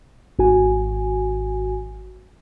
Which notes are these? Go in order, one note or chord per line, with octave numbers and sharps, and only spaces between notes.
G#1 F#4 G#5